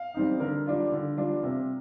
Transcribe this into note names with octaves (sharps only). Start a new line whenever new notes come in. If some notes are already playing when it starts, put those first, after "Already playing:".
Already playing: F5
G3 C4 D#4
D3 A#4
G3 D4 F4
D3
G3 D4 F4
C3